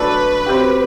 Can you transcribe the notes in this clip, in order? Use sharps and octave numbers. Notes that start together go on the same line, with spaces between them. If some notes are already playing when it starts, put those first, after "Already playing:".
Already playing: F#3 A3 D4 A4 B4 D5
F#3 C4 G4